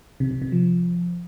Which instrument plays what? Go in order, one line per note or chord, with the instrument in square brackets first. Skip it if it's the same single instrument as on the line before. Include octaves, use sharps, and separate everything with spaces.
[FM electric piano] C3
C3
C3
F3